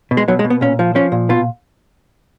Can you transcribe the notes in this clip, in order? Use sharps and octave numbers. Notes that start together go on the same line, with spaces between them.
B2
G#3
B2 F#3
G#3
B2
B3
A#2 C#4
F3
F3 C#4
A#2
B2 F4